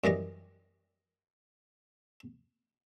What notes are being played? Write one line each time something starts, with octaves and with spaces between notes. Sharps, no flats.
F#2 E3 G3 D#5